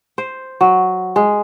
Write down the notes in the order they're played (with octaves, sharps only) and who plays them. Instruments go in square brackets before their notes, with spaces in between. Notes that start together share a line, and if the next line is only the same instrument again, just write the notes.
[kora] C5
F#3
G#3